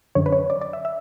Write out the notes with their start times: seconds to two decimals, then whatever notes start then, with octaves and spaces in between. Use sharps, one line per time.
0.15 F#2 D3 C#5
0.26 B4
0.33 C#5
0.50 D5
0.61 D5
0.73 E5
0.85 E5